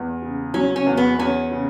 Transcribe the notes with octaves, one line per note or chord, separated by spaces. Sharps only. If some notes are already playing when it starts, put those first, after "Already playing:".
Already playing: E2
C#3
F#3 C#4
C#4
E2
B3
E2 C#4
C#3